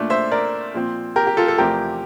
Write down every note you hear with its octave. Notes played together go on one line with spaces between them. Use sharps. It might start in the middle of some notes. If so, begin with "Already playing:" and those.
Already playing: A#2 A3 D4
C5 E5
A#4 D5
A#2 F3 C4
G4 A#4
G4
F4 A4
A4
E2 C3 F3 A3 C4 G4 A#4